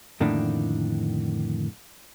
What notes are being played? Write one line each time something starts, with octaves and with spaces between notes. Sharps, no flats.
F2 A2 D3 D#3 A#3 D4